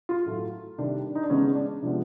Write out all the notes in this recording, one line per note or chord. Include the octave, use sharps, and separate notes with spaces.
F4
A2 F#3 A3
C3 D#3 G3 D4
D#4
D4
C#3 E3 G#3 B3 C#4
D4
C3 F3 G#3 B3 D4